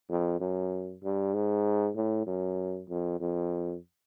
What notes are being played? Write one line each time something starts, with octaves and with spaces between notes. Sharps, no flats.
F2
F#2
G2
G#2
A2
F#2
F2
F2